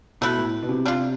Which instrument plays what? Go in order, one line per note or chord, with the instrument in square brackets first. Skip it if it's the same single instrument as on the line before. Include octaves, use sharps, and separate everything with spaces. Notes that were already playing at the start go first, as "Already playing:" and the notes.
[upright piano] B2 [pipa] A3 E4 B4
[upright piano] A2
B2
C3
[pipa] G3 D4 F4